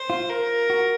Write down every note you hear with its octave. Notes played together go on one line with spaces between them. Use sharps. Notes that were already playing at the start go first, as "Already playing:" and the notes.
Already playing: C5
F4
A#4
F#4